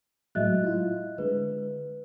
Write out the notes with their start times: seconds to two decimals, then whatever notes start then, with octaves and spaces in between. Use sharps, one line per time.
0.35 A2 F#3 G#3 D#5 E5 F#6
0.63 E4 F4
1.18 D3 G#3 B4